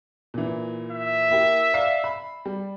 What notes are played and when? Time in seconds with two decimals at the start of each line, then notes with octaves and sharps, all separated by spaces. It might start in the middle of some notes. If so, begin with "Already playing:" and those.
0.34 A#2 E3
0.92 E5
1.30 A#3 E4 G4
1.74 D5 F5 C7
2.04 B5
2.46 G3